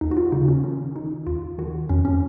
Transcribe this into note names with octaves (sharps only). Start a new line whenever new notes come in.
D#2 D#4
F#4
F4
C#3 D#4
C#4
D#3 C#4
D#3 D#4
D#2 F4
D#3 F#4
F2 C#4
C#4